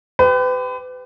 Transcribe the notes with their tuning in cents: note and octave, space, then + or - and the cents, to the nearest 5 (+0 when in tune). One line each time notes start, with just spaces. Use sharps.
G4 +0 B4 +35